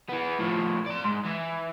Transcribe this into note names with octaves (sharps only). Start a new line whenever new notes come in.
E3 B3
A2 F3
D5 C6
G#2
E3